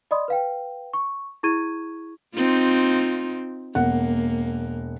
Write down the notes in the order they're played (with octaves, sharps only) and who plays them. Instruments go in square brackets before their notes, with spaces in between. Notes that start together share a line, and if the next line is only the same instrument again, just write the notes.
[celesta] D5 D#5 B5 C6 D#6
B4 F5 G5
C#6
E4 G#4 C#6 G#6 D#7
[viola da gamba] C4 D#4 F4
[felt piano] E1 F#5 [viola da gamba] A#3